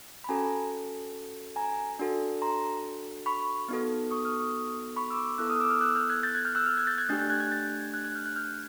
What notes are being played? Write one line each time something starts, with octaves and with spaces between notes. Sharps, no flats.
B5
C#4 F#4 A4 G#5 A#5
G#5 A#5
D4 F#4 A4
A#5 C6
B5 C#6
B3 D#4 F#4 A4
C#6 D#6
D#6 F6
C#6 D#6
B5 C#6
D6 E6
B3 E4 A4 E6 F#6
D#6 F6
D6 E6
D#6 F6
E6 F#6
F6 G6
F#6 G#6
G6 A6
F#6 G#6
F6 G6
E6 F#6
F6 G6
F#6 G#6
G6 A6
F#6 G#6
A3 D4 G4 G6 A6
G6 A6
F#6 G#6
F#6 G#6
G6 A6
F#6 G#6
F#6 G#6
F6 G6
F#6 G#6
F6 G6